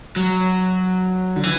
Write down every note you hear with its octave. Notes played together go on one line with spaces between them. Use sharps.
F#3
D3
E3